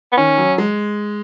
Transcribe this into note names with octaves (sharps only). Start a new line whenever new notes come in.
B3
D#3 C#4
F#3
G#3